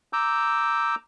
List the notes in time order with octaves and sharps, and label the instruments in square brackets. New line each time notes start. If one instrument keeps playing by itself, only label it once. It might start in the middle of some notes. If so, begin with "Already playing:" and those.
[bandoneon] A#5 D6 E6 G6